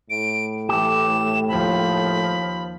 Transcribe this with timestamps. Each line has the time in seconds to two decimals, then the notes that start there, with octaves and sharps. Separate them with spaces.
0.10 A2 D7
0.69 E3 A3 G4 E7
1.48 D#2 F3 B5